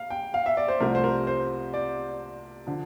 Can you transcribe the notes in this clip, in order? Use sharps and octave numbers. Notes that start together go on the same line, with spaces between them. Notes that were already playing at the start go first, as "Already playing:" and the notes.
Already playing: F5
G5
F5
E5
D5
C5
C2 C3 F3 A3 A#4
C5
A#4
C5
D5
D3 F3